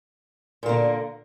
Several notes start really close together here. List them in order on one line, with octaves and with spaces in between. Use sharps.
A#2 A#3 D3